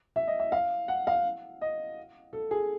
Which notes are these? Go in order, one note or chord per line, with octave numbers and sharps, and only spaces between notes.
E5
D#5
E5
F5
F#5
F5
D#5
A4
G#4